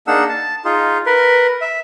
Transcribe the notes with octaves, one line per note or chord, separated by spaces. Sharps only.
A#3 D4 D#4 G#4 F#5 E6
A5
D#4 F4 G#4
A#4 B4
E5